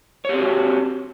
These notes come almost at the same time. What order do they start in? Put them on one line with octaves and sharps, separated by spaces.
C#5 G4 C4 F#4